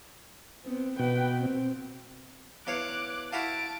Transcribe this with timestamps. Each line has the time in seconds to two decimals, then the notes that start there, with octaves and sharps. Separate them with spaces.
0.65 B3 C4
0.99 B2 B4 G5
1.38 C4
2.67 E2 C#5 F5 D6 F#6
3.33 E4 F#4 F5 A5 D7